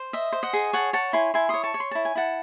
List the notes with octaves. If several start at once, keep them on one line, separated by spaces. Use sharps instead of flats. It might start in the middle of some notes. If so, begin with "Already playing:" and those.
Already playing: C5
D#5 E5
C5
D#5 F#5
G#4
C#5 F#5 A5
C#5 F#5 A5
E4 G#5 C6
E4 G#5 C6
C#5 C6 D#6
A5 C#6
C#5
C6
E4 A5
G#5
E4 F#5 A5